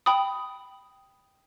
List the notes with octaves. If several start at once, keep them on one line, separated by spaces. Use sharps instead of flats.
G5 B5 D#6